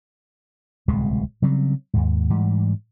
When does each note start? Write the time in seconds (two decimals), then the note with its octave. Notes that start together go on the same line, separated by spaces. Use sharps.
0.88 D1 C2 B2 G#3
1.42 C#3 F#3 G3 C4
1.94 D#2 G#2
2.30 G#2 E3 G3